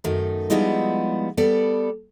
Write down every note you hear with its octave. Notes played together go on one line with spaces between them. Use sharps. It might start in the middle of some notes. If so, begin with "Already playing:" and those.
F#2 D#3 A3 D#4
F3 G3 G#3 B3 D#4 E4
G3 B3 A4 D5